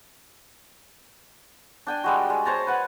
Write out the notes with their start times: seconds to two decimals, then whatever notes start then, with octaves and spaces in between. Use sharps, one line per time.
1.87 D4 G5 G#5
2.04 G3 G#3 F#4
2.30 G#3
2.45 C5 C#5 A5 A#5
2.67 B4 F#5 G#5